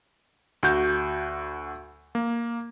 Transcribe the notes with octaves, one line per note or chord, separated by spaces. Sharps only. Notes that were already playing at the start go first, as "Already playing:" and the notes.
D2 F#4 G6
A#3